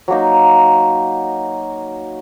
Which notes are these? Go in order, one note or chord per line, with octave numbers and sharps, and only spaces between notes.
F#3 A#3 D#4